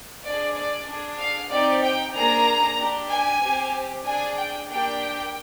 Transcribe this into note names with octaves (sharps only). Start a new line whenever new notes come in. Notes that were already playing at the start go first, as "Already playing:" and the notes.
D4 G#4 D5
D5
D4 G#4
F5
C4 D#4 G4 D5
G5
A#3 D4 G#4 A#5
D4 G4
G#5
C4 G4
D4 G#4 G#5
G5
A#3 D4 G4 G5